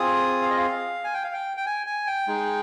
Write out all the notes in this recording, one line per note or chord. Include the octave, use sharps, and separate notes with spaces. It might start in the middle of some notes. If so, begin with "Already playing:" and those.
Already playing: C4 F4 G#4 D#6
F5
D#5
F5
G#5
G5
F5
G5
G5
G#5
G#5
G5
G#3 D#4 G#4